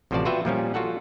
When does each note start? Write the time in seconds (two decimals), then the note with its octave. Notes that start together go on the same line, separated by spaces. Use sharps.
0.11 A1 C3 F3 F#4 D5 A5
0.25 F4 F#4 B4 E5 G5
0.45 A#2 F3 G3 C#4
0.74 F4 F#4 A4 F#5